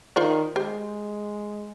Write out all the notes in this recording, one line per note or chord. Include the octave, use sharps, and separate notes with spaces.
D#3 F4 C5 D5
G#3 G4 C5